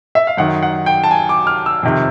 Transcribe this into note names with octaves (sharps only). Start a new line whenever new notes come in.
E5
F5
F#2 D#3 F#5
F#5
G5
A5
G#5
D6
F6
E6
F2 C3 D#3